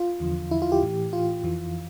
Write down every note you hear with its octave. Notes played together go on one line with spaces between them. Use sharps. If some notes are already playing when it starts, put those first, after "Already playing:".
Already playing: F4
E2 D3 F3
E4
F4
G4
A2 E3
F4
F2 E3